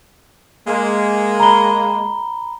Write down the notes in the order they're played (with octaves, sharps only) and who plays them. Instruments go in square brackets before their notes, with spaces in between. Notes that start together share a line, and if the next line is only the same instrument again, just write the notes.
[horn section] G#3 A#3
[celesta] A#5 B5 G7